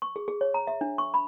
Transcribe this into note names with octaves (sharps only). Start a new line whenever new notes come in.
C#6
G#4
G#4
C#5
A#5
E5
D4
C#6
B5